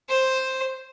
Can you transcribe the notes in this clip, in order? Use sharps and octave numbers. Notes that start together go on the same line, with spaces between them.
C5